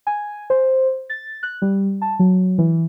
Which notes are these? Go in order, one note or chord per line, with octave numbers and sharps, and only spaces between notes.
G#5
C5
A6
F#6
G3
A5
F#3
E3